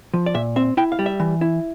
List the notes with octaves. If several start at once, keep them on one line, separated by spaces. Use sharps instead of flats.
F3
D5
A#2 E5
C4 E5
E4 G5
F5
G3
E5
E3
E4